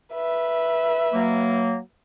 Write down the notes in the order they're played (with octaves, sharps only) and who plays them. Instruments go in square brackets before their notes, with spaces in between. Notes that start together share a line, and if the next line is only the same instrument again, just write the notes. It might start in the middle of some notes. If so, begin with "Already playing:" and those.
[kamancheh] B4 E5
[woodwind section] F#3 A#3